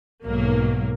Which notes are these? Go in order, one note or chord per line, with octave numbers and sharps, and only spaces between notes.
B1 G#2 F#3 A#3